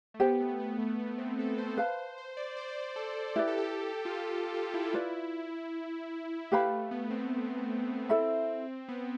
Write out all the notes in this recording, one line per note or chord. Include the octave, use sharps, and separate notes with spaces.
A3
B3 G4 C5 G5
A3
B3
A3
B3
C4
A4
C5
B4 C5 F5 A5
C5
D5
C5
D5
C5
A4
E4 G4 B4 D5
A4
G4
F4
G4
F4
F4
E4
F4 B4 D5
A3 G4 B4 F5 B5
B3
C4
E4 A4 E5 B5
B3